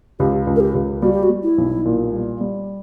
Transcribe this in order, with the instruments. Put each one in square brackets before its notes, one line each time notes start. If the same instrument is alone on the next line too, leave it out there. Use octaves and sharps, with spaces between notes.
[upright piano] C#2 [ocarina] G4
[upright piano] C#2
[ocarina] A#4
G4
[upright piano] C#2
[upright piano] G3 [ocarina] F#4
[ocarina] G4
F#4
[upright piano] G3
[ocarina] E4
[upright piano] B1
A#2
G3
G3